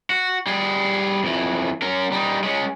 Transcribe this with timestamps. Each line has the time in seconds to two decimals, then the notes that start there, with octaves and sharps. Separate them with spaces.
0.10 F#4
0.47 G3 G#4
1.24 F2 E3
1.82 C#4 A#4
2.12 G3 D#4
2.44 G#3 C#4